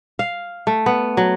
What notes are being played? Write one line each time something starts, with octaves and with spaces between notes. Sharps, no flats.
F5
A3
B3
F#3